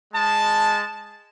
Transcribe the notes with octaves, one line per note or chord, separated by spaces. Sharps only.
G#3 A5